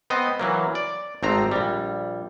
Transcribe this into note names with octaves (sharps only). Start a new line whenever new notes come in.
B3 C4 D#5
E3 F#3 A#3
D5
G#1 A3 C4 A#5
A#1 G3